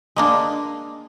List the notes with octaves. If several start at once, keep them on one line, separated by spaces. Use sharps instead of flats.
G#3 A#3 D4